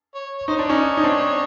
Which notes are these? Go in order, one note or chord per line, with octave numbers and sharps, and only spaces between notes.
C#5
C#5
D#4 C5
D4 C#5
C#4 D#4
D#4
C4 D4